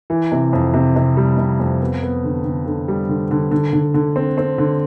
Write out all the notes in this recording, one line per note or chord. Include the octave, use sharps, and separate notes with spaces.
E3
C3
F2
C3
C3
G3
C3
F2
B3
B3
D3
D3
D3
G3
D3
D3
D3
D3
D3
C4
C4
D3